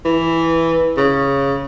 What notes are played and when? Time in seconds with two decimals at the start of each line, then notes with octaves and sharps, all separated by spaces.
0.05 E3
0.97 C#3